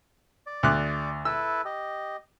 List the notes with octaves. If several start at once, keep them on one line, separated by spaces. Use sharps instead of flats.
D5
D2 D6 F#6
E4 A4 B4 E6
G4 D#5